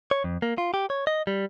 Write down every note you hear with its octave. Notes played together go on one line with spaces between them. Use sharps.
C#5
F2
A#3
F4
G4
C#5
D#5
G3